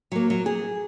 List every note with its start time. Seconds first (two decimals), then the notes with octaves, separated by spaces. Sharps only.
0.12 F#3 A#3
0.30 F#3
0.46 G#4